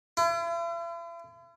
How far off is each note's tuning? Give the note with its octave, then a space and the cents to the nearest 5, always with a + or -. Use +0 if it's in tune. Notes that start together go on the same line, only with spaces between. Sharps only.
E4 +45